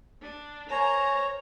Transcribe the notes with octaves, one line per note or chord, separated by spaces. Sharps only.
D4
A#4 C5 C#5 G#5 A#5